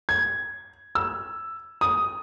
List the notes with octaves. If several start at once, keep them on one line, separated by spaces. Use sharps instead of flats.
G#6
E6
D#6